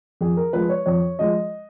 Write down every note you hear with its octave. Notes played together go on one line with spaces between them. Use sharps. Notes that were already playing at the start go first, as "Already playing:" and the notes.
F2 G#4
A#4
F3 G#3 B4
C#5
F2 C#5
F3 G#3 D#5